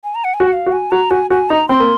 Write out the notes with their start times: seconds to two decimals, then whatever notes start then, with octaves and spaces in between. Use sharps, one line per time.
0.04 G#5
0.15 A#5
0.24 F#5
0.34 G#5
0.40 F#4
0.47 F#5
0.53 F5
0.66 F#4
0.72 G#5
0.91 F#4 A#5
1.10 F#4 G#5
1.30 F#4 G#5
1.50 D#4 A#5
1.68 C4 C6
1.80 A#3